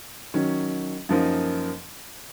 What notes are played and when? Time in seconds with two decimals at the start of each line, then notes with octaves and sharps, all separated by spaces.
0.34 D#3 F#3 C#4
1.09 F#2 F3 A#3 D#4